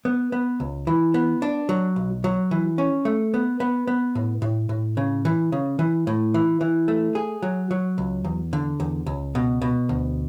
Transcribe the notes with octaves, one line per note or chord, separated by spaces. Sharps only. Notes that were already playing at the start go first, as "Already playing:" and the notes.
B3
B3
C#2
E3
B3
D4
F#3
B1
F#3
E3
C#4
A3
B3
B3
B3
A2
A2
A2
C#3
E3
C#3
E3
A2
E3
E3
A3
G#4
F#3
F#3
C#2
E2
D3
E2
C#2
B2
B2
D2